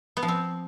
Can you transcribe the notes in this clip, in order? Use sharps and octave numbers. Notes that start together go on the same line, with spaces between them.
B3
F3
C4